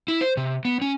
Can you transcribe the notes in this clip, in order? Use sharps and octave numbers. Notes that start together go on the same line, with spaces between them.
E4
C5
C3
B3
C#4